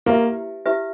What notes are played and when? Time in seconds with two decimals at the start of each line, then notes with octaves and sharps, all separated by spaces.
0.06 A#3 E4 G4 B4 E5
0.66 E4 G4 B4 E5